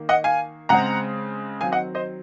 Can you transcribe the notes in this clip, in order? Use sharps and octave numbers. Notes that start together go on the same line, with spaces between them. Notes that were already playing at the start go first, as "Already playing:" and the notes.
Already playing: D#3 A#3
D#5 F#5
F5 G#5
C#3 G#3 C4 F#5 A#5
D#3 F#3 C4 F5 G#5
D#5 F#5
C5 D#5